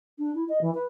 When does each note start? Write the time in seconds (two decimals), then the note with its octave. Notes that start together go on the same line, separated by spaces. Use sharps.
0.18 D4
0.34 E4
0.48 D#5
0.61 E3
0.74 B4